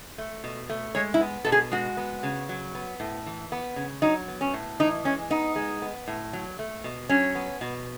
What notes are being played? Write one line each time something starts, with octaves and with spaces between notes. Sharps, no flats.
A3
B2
A3
G#3 C#5
E4
B3
B2 A4
G#4
G#3 F#4
B3
C#3
F#3
B3
A2
E3
B3
C#3
F#3 D#4
B3
C#4
A2
E3 D#4
G#3 C#4
B3 D#4
G#3
B3
A2
F#3
A3
B2
F#3 C#4
B3
B2